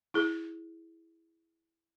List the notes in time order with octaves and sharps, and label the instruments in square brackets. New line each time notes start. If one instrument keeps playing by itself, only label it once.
[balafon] E4 G#4